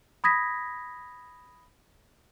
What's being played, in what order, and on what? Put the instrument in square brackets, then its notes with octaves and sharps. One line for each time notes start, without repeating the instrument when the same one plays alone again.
[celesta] B5 D#6 G#6 A#6 B6